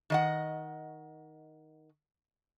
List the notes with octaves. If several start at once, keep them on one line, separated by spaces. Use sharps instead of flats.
D#3 D#5 F#5